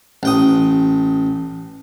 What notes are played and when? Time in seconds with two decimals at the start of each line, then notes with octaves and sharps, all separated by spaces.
0.23 A1 G5 D#6